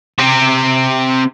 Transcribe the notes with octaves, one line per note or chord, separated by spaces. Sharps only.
C3 C4